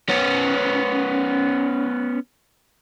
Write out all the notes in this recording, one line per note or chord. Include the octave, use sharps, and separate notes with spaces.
B3 C#4